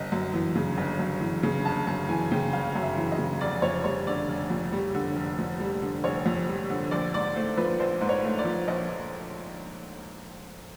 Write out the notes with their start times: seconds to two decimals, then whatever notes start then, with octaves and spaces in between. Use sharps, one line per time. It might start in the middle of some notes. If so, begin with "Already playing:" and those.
Already playing: G1 D#5
0.12 F#2
0.34 E3
0.55 C#3
0.78 G1
0.99 F#2
1.21 E3
1.43 C#3
1.65 G1 A5
1.87 F#2 A5
2.09 E3 G#5
2.31 C#3 G5
2.53 G1 F5
2.75 F#2
2.82 E5
2.97 E3
3.12 D#5
3.18 C#3
3.41 F1 D5
3.62 F2 C#5
3.84 G3 C#5
4.07 D3 D5
4.28 F1
4.50 F2
4.72 G3
4.95 D3
5.16 F1
5.39 F2
5.60 G3
5.82 D3
6.04 F1 C#5
6.26 F2
6.48 G3
6.70 D3
6.91 A#1 D5
7.14 G#2 D5
7.35 A3 C5
7.58 F3 B4
7.80 A#1 C5
8.01 G#2
8.09 C#5
8.23 A3
8.39 D5
8.45 F3
8.68 A#1 D#5